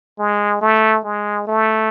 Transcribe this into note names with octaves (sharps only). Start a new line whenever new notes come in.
G#3
A3
G#3
A3